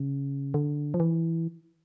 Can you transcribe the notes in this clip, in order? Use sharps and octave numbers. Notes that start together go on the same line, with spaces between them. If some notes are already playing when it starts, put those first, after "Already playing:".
Already playing: C#3
D3
F3
E3